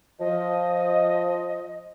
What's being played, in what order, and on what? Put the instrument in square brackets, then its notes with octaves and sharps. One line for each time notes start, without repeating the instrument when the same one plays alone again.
[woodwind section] F3 [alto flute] D#5